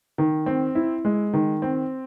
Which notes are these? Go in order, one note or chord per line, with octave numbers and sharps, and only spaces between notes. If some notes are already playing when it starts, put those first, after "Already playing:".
D#3
C4
E4
G#3
D#3
C4